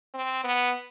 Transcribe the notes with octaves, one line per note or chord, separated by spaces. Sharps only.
C4
B3